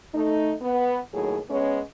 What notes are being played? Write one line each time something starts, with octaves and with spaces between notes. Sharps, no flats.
A3 D#4
B3
D#2 A2 F#3 G#4
G#3 B3 C#4